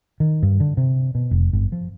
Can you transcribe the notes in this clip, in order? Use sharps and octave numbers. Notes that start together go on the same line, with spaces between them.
D#3
G2
D3
C3
B2
F1
G1
F3